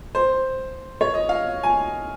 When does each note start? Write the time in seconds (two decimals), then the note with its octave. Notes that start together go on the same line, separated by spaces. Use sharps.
0.15 C5
1.01 C#5
1.14 D#5
1.29 F5
1.63 G#5